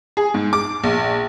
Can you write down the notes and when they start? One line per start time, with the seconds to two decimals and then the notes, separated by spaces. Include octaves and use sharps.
0.17 G#4
0.34 G#2
0.53 D6
0.83 A#1